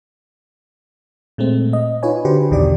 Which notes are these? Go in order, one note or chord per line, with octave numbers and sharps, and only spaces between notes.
A#2 G#3 A3 C4
D#5
D#4 F4 B4 C#5 G#5
D3 F#4 G4 B4 C5
B1 E2 B2 D#3 G4 D5